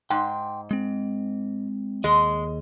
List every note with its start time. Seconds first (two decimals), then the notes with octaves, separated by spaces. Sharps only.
0.11 G#2 G5 C6
0.71 G#3 C4
2.04 D#2 G#3 G#4 D#5